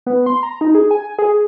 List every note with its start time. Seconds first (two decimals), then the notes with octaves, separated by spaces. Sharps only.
0.06 B3
0.26 C6
0.43 A#5
0.61 D#4
0.75 G#4
0.91 G#5
1.19 G#4